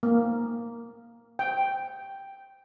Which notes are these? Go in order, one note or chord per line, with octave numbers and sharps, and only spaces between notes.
A#3
G5